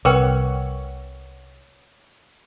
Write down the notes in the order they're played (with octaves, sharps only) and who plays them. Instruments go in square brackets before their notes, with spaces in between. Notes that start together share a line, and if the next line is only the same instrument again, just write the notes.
[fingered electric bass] C2 C3 [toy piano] A#4 B4 G5 [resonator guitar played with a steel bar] C#5 F#5